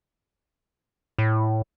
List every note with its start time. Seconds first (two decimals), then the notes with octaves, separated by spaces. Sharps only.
1.18 A2